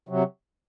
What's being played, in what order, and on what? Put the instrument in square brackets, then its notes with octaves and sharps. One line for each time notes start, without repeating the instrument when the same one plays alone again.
[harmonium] C3 F#3